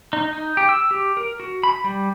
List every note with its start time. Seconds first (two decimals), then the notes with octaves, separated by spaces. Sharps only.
0.13 D#4
0.33 D#4
0.57 G4
0.69 E6
0.91 G4
1.17 A#4
1.40 F#4
1.63 B5
1.84 G3